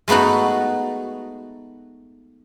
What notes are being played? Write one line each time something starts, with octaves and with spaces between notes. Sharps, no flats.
G#3 A3 B3 D#4 F#4